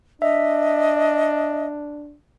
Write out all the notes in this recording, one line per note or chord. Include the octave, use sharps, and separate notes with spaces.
D4 D#5 E5